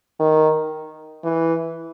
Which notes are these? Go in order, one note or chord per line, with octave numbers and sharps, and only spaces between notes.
D#3
E3